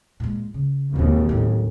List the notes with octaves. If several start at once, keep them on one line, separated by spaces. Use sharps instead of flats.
A#2 G#3
C#3
G#1 D#2 A#2 C#3 E3
A2 F#3